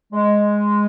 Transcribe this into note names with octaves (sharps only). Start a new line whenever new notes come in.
G#3